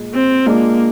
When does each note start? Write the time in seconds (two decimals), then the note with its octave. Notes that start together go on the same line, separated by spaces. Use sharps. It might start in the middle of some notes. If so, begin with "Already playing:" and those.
Already playing: A#2 G#3
0.14 C4
0.46 G#3 A#3 D4 F4